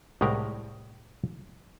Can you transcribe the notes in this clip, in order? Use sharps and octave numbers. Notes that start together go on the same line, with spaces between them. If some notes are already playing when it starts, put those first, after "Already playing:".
C2 A2 G#3 G4 A#4 A#5